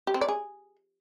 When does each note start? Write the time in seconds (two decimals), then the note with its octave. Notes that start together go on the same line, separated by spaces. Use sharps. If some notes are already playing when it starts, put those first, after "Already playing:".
0.07 G4
0.14 C4
0.21 D5
0.29 G#4